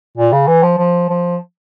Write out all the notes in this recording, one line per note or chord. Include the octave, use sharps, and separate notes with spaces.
A#2
C#3
E3
F3
F3
F3